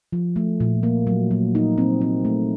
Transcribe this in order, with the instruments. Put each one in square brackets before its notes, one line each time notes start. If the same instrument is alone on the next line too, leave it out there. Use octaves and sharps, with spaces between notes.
[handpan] F3
A3
A#2
A#3
F#3
F#3
D#4
C4
C4
A3